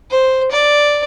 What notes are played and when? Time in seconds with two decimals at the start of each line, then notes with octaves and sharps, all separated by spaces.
0.10 C5
0.51 D5